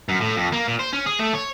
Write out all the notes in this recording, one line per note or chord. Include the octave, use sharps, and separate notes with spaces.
F#2
A2
F2
A#3
A#2
C5
C#4
G#4
A3
C#5